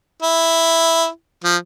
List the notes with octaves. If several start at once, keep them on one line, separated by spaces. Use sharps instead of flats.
E4
F3